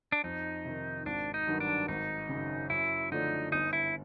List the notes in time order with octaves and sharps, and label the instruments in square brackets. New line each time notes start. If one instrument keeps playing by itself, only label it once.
[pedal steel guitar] D4
[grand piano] F2 [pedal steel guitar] D#4
[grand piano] C3 D#3
[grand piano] G#1 [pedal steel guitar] D4
[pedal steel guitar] D#4
[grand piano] G2 D#3 F#3
[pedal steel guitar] D4
[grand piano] G#1 [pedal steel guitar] D#4
[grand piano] F#2 C#3
[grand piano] F#2 [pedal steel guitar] E4
[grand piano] D3 F3 A3 D4 [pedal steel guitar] D#4
[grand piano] G1 [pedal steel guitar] D#4
[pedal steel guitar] E4